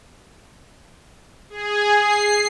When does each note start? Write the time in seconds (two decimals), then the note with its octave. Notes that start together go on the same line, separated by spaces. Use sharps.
1.50 G#4
1.97 C7